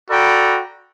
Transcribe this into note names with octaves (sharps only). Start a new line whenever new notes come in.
F#4 A4 D5 G5 A#5 B5